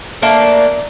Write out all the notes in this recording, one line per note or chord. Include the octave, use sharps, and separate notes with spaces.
A3 A#3 D4